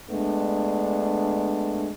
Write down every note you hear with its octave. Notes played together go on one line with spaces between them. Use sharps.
G#3 A3 B3 D4